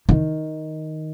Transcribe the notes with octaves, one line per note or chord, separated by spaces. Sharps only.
D#3